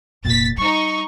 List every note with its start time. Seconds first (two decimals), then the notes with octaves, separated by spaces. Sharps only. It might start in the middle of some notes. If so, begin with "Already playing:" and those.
0.25 F1 A#2 A6 B6
0.57 G3 D#4 C#6